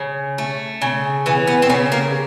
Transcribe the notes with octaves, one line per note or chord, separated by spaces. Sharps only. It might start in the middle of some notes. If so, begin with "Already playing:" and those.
Already playing: C#3
A3
C#3
E3 B3
B3
C4
C#3 B3
A#3